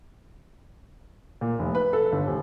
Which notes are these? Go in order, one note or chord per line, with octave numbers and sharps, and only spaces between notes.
A#2
F1
B4
A4
G1
D#1